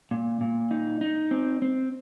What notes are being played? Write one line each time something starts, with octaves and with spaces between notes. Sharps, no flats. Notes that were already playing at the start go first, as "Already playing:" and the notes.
A#2
A#2
D#4
D#4
C4
C4